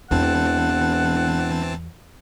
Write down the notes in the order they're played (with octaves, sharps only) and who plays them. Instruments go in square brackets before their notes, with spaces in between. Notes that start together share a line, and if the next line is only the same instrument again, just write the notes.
[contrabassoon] E1 [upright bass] E2 [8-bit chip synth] E3 C4 A5 [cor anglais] F#5